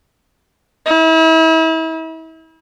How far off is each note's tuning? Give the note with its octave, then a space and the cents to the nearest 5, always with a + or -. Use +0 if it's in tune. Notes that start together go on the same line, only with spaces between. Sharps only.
E4 -35